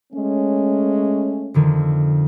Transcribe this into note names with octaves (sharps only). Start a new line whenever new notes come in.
G#3 A3 C#4
F2 D3 D#3